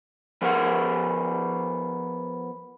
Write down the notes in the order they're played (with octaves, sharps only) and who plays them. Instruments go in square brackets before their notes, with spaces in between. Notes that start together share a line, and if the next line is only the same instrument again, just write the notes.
[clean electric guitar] F3 B3 A#4 F#5